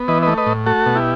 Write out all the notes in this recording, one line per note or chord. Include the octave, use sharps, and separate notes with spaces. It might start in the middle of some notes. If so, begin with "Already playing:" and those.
Already playing: B3
E3 B4 D#5
A3 B4 D#5
B4 D#5
A2
A3 F#4 A4
B2
E4 G4